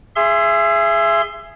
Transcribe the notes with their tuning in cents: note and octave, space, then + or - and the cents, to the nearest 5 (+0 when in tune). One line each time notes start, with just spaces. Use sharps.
G#4 +0 E5 +30 C6 +0